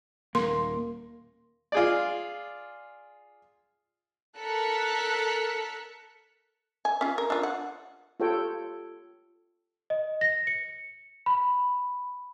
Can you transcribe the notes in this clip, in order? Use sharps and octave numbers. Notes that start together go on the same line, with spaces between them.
D#1 A#3 C6
F4 G#4 D5
A4 A#4 A5 F#6 B6 C#7
G#5
C#4 F4
A#4
D4 F4
F#5
F4 G4 A4 C#5 G5
D#5
A#6
C#7
B5